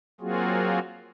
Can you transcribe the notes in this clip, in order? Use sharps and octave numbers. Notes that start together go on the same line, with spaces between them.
F#3 A#3 C4 F4 F#4 G#4